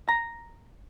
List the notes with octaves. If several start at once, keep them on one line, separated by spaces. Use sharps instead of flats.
A#5